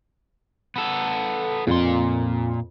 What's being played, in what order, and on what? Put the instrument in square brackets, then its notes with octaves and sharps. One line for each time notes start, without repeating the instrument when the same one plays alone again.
[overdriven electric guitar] B3 A4
[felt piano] F2 [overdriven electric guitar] A#2 C6